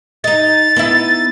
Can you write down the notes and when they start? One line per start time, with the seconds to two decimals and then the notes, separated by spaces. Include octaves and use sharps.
0.24 D#4 D#5 A6
0.76 B3 D#4 E4